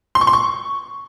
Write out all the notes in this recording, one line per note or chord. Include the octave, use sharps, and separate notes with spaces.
C6
C#6
C6
C#6